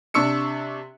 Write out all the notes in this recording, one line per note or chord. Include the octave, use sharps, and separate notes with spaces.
C3 D4 C#6 E6 C#7